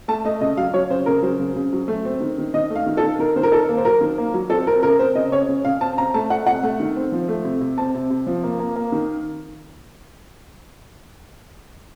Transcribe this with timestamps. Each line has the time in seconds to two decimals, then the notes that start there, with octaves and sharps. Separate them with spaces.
0.08 A3 A5
0.25 A3 D#5
0.41 C#3 D#5
0.57 F#3 F5
0.74 F#3 C#5
0.90 C#3 C5
1.06 C#3 A#4
1.22 F#3 C5
1.40 C#3
1.56 C#3
1.73 F#3
1.88 A3
2.05 C4
2.21 D#3
2.38 D#3
2.54 D#3 D#5
2.70 A3
2.76 F5
2.86 D#3
2.97 A4
3.03 D#3
3.19 D#3 A#4
3.36 D#3 C5
3.43 A#4
3.52 D#3 A4
3.69 A#3
3.77 C5
3.85 F#3 A#4
4.01 D#3
4.18 A#3
4.34 F#3
4.50 C4 A4
4.67 C4 A#4
4.83 C#3 A#4
4.99 C4 C5
5.15 C#3 D#5
5.32 C#3 C#5
5.49 C#3
5.65 C#3 F5
5.81 C4 A5
5.98 C4 A#5
6.14 A3 A5
6.30 A3 F#5
6.46 C3 F#5
6.63 A3
6.80 D#3
6.96 C4
7.12 F3
7.28 A3
7.44 C3
7.61 C3
7.78 C4 A5
7.94 C3
8.10 C3
8.27 F3
8.43 A#3
8.59 A#3
8.76 A#3
8.92 D#3